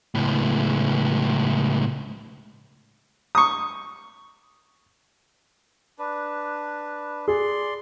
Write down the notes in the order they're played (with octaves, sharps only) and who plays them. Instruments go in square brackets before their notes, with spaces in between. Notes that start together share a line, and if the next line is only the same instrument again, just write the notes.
[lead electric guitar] C#2 A2
[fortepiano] C#6 D#6
[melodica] D4 B4
[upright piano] G#4 [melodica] D5 C6